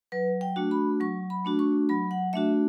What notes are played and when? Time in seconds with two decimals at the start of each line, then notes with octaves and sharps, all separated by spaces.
0.12 F#3 B4
0.41 G5
0.56 A3 D4 F#4
0.71 B5
1.00 F#3 C#6
1.30 B5
1.45 A3 D4 F#4
1.59 C#6
1.89 F#3 B5
2.11 F#5
2.33 A3 D4 F#4 E5